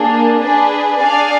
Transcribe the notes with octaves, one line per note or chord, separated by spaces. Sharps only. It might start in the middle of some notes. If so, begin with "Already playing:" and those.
Already playing: A#3 D4 G#4
D4 G#4 B4
D4 G#4 D5 F5 G#5